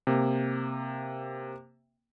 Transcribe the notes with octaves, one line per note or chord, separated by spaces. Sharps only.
C3 A#3